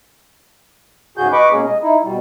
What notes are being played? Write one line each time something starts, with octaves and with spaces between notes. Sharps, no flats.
G#2 C#3 F#4 G#4 G6
B4 D#5 B5 C#6 D6
B2 G#3 A#3 C#4 G#4
D#5
D#4 E4
B2 G3